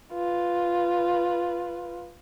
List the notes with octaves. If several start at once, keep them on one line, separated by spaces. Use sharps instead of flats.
F4 B4